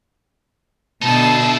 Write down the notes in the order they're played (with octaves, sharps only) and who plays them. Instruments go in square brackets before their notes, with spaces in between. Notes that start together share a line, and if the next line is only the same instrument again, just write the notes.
[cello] B2 D3 [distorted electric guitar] D#4 E4 [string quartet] A5